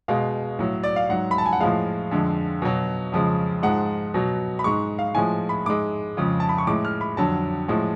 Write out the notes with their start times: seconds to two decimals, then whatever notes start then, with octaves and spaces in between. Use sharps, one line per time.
0.08 B2 G#3 F5
0.59 A2 F#3
0.83 D5
0.96 F5
1.09 G#2 F#3 F#5
1.31 B5
1.38 A5
1.46 G#5
1.53 F#5
1.60 A2 F3 G#3 F5
2.11 F2 D3 G#3
2.62 B2 F#3
3.12 F2 C#3 F3 G#3
3.63 G#2 F3 G#3 F#5
4.14 B2 F#3
4.59 B5
4.64 G#2 G#3 C#6
4.99 F5
5.15 A2 F3 G#3 G#5
5.49 B5
5.66 G#2 G#3 D6
6.17 F2 C#3 F3 G#3
6.40 A5
6.49 B5
6.58 C#6
6.67 A2 G#3 D6
6.85 F6
7.01 B5
7.17 F2 D3 F#3 A5
7.68 A2 F3 G#3